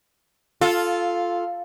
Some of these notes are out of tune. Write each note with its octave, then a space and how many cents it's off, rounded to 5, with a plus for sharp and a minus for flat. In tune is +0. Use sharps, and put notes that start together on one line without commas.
F4 +0 A4 -10